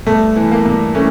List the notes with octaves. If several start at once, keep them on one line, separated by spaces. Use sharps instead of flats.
G2 A3
E3
A#3
G2
E3 A3 C#4